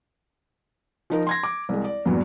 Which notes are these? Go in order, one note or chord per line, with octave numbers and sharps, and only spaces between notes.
F3 D#4 A#4
C6 G#6 A#6
D6
C2 G#3
D5
E2 G2 A#2 F#3